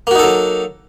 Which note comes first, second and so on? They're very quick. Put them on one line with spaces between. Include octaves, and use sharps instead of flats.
A#3 F#4 D#4 A4 F#3